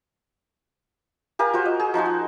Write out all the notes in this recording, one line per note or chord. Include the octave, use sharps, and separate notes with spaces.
G4 A#4 F5 G#5
F4 F#4 C5
D#5
G#4
F3 D#4 F#4 C6
F#4